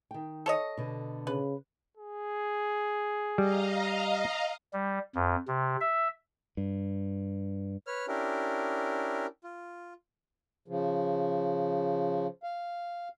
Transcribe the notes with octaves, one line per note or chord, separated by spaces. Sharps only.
D#3 G5
A4 C#5 D#5
B2 D3
C#3 B4
G#4
G3 D#5 F5 A#5
G3
F2
C3
E5
G2
B4 C#5 F6
C#4 D4 E4 G4 A#4
F4
C#3 F3
F5